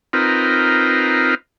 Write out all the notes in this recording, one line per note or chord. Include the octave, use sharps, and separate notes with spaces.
C4 D#4 F4 A#4 B4